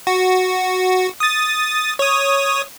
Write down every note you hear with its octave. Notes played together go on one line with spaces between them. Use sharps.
F#4
D#6 A6
C#5 D#6